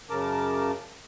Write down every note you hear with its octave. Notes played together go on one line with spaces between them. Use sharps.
F#2 C#3 A#4 A5 D6